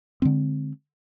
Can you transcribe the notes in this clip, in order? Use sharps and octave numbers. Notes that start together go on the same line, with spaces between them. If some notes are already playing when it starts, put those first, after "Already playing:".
D3 E3 G#3 C4